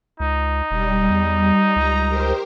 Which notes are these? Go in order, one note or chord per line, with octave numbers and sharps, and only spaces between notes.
C#2 D#4
E1 G3
E2
C#2 A#5
G4 A#4 C5